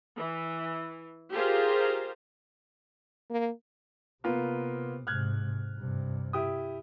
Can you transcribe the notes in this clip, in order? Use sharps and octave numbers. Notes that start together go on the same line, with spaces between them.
E3
F4 G4 G#4 A#4 C5 F5
A#3
C3 A#3 B3 F4
G#2 C3 F6 F#6 G#6
G2 C3
E4 G4 D#6